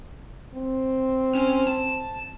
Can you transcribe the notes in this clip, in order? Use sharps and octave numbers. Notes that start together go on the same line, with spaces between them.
C4
C#4
A5